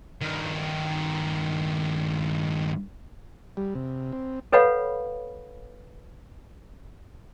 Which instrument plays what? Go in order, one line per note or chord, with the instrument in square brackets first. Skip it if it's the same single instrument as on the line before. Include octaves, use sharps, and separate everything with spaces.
[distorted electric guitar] G2 D#3
[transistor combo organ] G3
C3
C4
[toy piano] A4 B4 C#5 F5 F#5 B5